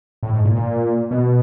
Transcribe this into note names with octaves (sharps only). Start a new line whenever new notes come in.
A2
G#2
A#2
A#2
B2